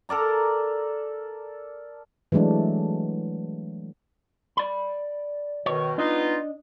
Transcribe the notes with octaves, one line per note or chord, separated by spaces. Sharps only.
A4 A#4 D5 A#5
E3 F#3 G#3 A3 D4
D5 B5
B2 D#3 C#5
B3 D4 D#4 F4 D#5